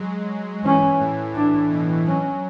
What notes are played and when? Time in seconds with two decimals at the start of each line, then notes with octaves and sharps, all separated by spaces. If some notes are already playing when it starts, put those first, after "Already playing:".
Already playing: F#3 G#3
0.64 E3 C#4
1.00 A2
1.35 A2 D4
1.70 B2
2.06 F#3 C#4